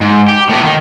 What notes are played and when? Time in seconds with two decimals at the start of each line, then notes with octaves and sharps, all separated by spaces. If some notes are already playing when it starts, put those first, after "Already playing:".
0.01 G#2
0.29 G4
0.50 A2 B3
0.63 D#3